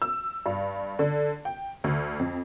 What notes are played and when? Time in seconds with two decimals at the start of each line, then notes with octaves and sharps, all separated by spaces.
0.02 E6
0.46 G2
0.99 D3
1.45 G5
1.84 D2
2.19 F2